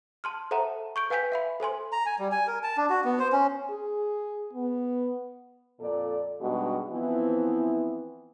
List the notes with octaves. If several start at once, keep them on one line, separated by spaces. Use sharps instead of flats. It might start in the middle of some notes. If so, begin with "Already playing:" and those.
A5 C6 F6
A4 C5 E5 F#5 A5 A#5
C#6 G6 D7
B4 F5 G5 G#5 G6 B6
E5 F5 B5
A4 C5 G#5 C6
A#5
G#5
G3
G#5
A#4
A5
D4
F#4
B3
C5
C#4
G#4
B3
F2 A#2 A4 D5
G2 B2 G#3 D#4 F#4
E3 F3 B3 C4 E4